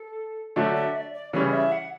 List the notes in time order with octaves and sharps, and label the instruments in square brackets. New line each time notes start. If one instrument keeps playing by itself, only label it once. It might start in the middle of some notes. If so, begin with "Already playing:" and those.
Already playing: [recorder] A4
[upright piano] D3 F#3 A3 D4 [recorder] E5
[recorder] E5
D5
D5
[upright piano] C#3 E3 G3 C#4 [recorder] D5
[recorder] E5
F#5